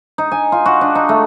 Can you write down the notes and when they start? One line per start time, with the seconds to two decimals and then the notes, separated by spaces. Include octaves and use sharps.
0.18 D#4
0.32 G#5
0.52 F4
0.66 F#4
0.81 D4
0.95 D#4
1.09 A3